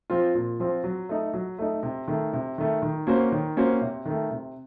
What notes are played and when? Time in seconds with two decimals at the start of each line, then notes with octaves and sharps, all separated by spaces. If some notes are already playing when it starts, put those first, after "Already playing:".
0.10 F3 C4 F4
0.35 A#2
0.60 F3 C4 F4
0.84 F#3
1.09 A3 D#4
1.34 F#3
1.58 A3 D#4
1.83 C3
2.08 D#3 A3
2.33 C3
2.58 D#3 A3
2.82 D#3
3.07 A#3 C#4 F#4 C5
3.32 D#3
3.57 A#3 C#4 F#4 C5
3.81 C3
4.05 D#3 A3
4.31 C3